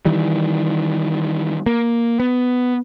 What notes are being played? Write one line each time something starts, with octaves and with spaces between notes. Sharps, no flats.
D#3 E3 G3
A#3
B3